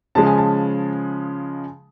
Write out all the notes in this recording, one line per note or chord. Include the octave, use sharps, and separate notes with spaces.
C#3 F3 G#3 A5
G#5
A5